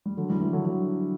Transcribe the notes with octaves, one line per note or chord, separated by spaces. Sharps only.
G3
D3 F#3
E3 G3
E3 G3
D3 F#3
D3 F#3